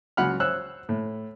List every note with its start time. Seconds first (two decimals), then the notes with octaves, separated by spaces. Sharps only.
0.17 C#2 F#3 F#5 B5 F6
0.40 C5 C#5 E6 F#6
0.89 A2